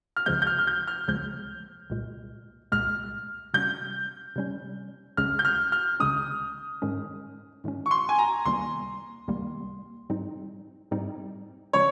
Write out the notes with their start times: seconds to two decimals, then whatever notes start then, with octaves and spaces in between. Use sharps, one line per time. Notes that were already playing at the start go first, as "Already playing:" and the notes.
0.17 F6
0.26 C#2 C#3 F3 G#3 G6
0.42 G6
0.47 F6
0.59 F6
0.67 G6
0.87 F6
1.08 C#2 C#3 F3 G#3 G6
1.90 C2 A#2 G#3
2.72 C2 A#2 G#3 F6
3.54 C3 G3 C#4 G6
4.36 C3 G3 C#4
5.17 C#2 C#3 G#3 C#4 F6
5.39 G6
5.45 F6
5.72 F6
6.00 C#2 C#3 G#3 C#4 D#6
6.82 G#2 D#3 G#3 C#4
7.64 G#2 D#3 G#3 C#4
7.86 C#6
7.91 C6
8.09 G#5
8.18 A#5
8.45 C#2 C3 D#3 G3 A#3 C6
9.28 C#2 C3 D#3 G3 A#3
10.10 G#2 G3 C4 D#4
10.91 G#2 G3 C4 D#4
11.73 C#3 F3 G#3 C#4 C#5